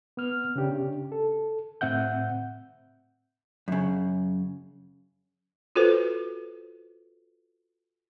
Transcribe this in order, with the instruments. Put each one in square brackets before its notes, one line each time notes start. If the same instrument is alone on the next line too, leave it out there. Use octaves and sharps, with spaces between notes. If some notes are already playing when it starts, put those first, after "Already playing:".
[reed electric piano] B3 F6
C#3 C#4 D4 G4
A4
A2 C4 E5 F#5 G6
[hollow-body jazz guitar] F#2 C#3
[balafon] F4 F#4 A4 B4 C5